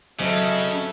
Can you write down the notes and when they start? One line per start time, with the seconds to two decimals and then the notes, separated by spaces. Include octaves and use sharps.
0.19 C#3 F#3 C4 A4 D#5 E5